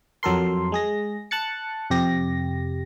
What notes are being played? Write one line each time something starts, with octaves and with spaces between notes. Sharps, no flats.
F2 F#3 A4 A#4 C6
G#3 G#4 A#6
A5 F#6 A6 C#7
F2 C3 G4 A#6